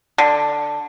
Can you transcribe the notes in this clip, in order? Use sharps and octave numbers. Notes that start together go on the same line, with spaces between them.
D3